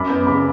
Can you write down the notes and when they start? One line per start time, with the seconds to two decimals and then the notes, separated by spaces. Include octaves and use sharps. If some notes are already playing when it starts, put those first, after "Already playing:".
Already playing: F#2 B5 D6
0.10 B3
0.27 C#3 B5 D6